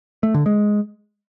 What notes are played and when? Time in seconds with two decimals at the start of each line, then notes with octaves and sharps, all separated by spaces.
0.23 A3
0.34 D3
0.46 G#3